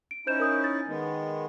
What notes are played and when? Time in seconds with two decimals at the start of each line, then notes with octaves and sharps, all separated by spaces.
0.11 D7
0.27 C#4 D#4 E4 C5 G6 E7
0.40 A#4 D#6 G6
0.64 A6
0.87 D#3 G#3 B3